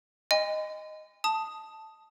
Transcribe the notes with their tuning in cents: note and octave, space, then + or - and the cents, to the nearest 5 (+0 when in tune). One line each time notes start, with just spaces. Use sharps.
D#5 +0 G#5 -45 C6 -45
A5 +0 D#6 +0